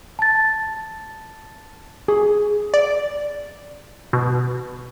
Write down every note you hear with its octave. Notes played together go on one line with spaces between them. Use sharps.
A5 A6
G#4
D5
B2